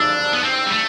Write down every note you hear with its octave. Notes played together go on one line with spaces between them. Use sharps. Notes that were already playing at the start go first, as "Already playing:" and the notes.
Already playing: D4 E6
B3
C4
G3
A3